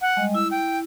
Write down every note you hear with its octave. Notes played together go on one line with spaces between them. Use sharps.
F#5
G3 G#3 D#5
E4 E6
G5